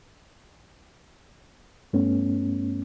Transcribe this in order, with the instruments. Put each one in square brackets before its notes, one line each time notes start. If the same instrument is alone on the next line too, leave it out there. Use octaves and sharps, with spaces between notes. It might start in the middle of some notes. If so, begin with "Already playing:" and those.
[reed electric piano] G2 A3 B3 C#4